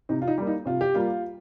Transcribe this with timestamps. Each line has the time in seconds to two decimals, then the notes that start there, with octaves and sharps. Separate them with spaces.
0.09 C3 D#4
0.22 F4
0.27 D#4
0.38 G3 A#3
0.47 D#4
0.66 C3 F4
0.81 G4
0.95 G3 A#3 F4